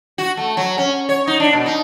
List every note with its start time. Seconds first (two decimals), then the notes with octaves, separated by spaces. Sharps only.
0.18 F#4
0.37 A3
0.57 F#3
0.78 C#4
1.09 C#5
1.27 D#4
1.40 D4
1.53 B2
1.66 D#4